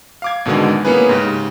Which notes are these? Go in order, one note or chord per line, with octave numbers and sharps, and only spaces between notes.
F5 D6 G#6
G#1 B2 D3 D#3 G#3
A#3 B3 C#4 E4 G#4 B4
G#2 C#3 G4